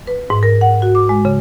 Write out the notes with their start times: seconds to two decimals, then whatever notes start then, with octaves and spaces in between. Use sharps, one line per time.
0.07 B4
0.30 G#2
0.43 A#4
0.61 F#5
0.82 F#4
0.95 D6
1.09 G#3
1.25 C#3